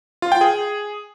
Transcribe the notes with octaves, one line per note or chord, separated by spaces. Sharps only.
F4
G5
G#4